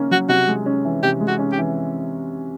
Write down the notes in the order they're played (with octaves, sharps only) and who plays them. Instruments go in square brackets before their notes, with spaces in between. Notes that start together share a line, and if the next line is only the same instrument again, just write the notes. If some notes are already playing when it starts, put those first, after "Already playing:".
Already playing: [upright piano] C#3 A#3 C#4
[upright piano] F#3 [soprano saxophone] F#4
[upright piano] C3 [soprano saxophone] F#4
[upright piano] G#3
C#4
E3
[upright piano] C3 [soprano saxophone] G4
[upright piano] G#3
[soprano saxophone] F#4
[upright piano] C#4
[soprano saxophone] G4
[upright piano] E3